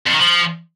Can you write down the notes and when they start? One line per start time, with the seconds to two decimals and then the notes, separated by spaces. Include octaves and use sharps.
0.06 F2
0.13 D#3
0.20 F3